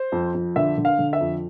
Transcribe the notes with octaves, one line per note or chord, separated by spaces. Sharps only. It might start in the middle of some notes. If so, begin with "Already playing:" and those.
Already playing: C5
F2
F2
D3 E5
D3
F5
D3
E5
F2